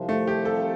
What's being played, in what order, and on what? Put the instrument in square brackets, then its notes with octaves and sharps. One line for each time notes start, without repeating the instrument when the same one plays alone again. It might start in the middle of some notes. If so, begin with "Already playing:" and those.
Already playing: [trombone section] C2 C3 F3
[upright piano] A3
G4
A4